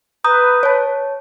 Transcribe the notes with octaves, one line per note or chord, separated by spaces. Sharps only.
B4 A#5 D#6 G6
C#5 A5